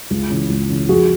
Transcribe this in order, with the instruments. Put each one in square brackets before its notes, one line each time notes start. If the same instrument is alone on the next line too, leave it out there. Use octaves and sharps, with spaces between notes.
[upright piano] C#2
C#3 E3
C#2
C#3 E3
F2 F#4 G#4